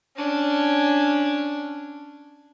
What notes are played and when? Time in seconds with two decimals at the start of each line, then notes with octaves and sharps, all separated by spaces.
0.16 C#4 D4